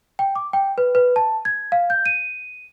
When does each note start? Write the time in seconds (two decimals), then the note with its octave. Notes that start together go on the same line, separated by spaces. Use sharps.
0.19 G5
0.36 D6
0.53 G5
0.78 B4
0.95 B4
1.16 A5
1.45 G#6
1.72 F5
1.90 G6
2.06 D#7